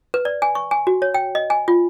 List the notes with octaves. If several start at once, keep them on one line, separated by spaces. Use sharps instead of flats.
B4
D5
G#5
C#6
G#5
F#4
C#5
G5
D#5
G#5
F4